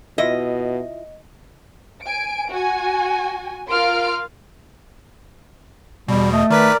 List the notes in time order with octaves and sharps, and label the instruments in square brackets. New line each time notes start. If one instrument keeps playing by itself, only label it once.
[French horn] B2 [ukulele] E4 F4 E5 [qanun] D#5
[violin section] G#5 D7
F#4 G#5
F4 A#4 F5 C6 F6 D7
[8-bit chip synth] E2 B2 [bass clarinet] G3
[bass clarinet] A3 [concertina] D#5
[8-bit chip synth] D#3 B4 B6 [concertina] A#4 D5